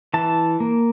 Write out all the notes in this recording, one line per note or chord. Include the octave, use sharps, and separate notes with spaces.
E3 A5
A#3